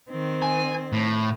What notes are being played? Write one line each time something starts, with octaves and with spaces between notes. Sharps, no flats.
D#3 C4
G#5
A2